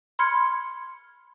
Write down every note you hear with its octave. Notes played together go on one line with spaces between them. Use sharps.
B5 C6 F6 G#6 C#7